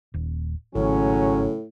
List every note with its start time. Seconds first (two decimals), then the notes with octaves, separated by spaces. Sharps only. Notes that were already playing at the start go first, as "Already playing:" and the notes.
0.14 D#1
0.75 G#1 A2 C#3 F#3 C#4